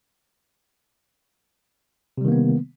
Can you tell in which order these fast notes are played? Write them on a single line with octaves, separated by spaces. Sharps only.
C3 G3 D#3 A#3 B3